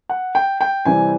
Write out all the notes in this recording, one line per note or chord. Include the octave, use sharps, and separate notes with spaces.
F#5
G5
G5
C3 E3 G3 G#5